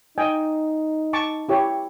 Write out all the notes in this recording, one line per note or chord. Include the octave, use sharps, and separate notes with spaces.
D#4 D#5 G5 G#5
A5 C#6 D6
E4 G4 C#5